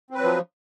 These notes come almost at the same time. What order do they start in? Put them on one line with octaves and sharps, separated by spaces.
C4 B4 F#3 F3